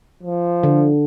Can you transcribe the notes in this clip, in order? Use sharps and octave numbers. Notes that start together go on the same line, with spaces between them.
F3
D3